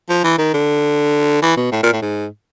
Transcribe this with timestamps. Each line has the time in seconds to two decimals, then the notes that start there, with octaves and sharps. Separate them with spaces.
0.09 F3
0.24 E3
0.38 D#3
0.53 D3
1.42 E3
1.57 B2
1.72 A2
1.83 A#2
1.93 A2
2.02 G#2